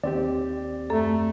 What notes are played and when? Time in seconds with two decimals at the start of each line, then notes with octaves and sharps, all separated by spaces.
0.04 D#2 C4 G4 D5
0.90 F#2 A3 A4